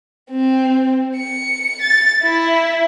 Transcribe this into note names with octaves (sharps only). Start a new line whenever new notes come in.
C4
C#7
A6
E4